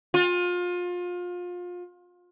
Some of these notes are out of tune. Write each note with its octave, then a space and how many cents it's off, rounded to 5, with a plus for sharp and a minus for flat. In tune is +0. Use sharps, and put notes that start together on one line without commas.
F4 +30